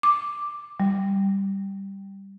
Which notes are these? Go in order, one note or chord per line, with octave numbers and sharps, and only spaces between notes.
D6
G3